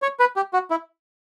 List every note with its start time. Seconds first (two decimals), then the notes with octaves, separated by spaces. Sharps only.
0.02 C#5
0.20 B4
0.36 G4
0.53 F#4
0.70 E4